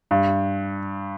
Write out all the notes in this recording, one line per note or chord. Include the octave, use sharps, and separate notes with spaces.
G2